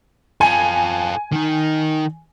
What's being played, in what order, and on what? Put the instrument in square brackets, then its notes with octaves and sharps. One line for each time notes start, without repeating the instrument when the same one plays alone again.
[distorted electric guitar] F4 A4 [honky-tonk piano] G#5
[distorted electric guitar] D#3 D#4